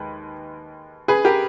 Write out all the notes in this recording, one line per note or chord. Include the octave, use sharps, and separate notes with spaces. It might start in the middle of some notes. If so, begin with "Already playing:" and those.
Already playing: D#2 G#3 B4
G#4 B4
G4 A#4